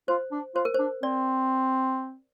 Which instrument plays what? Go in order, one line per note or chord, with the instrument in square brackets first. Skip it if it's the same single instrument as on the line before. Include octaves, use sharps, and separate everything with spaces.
[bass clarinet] F4 [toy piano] C5
[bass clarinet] D4
[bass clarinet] F4 [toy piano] C5
[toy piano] A#4
C5
[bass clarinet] D4
[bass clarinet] C4 [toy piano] D5